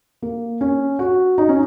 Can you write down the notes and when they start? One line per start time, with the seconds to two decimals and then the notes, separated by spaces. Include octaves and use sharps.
0.22 A#3
0.61 C#4
0.99 F#4
1.38 D#4
1.49 C#4